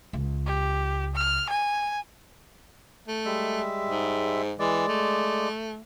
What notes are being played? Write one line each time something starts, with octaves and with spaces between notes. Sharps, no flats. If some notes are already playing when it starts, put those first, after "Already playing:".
C#2
G4
F6
G#5
A3
G3 G#3 E5
G#2
E3 G#3 D5
A3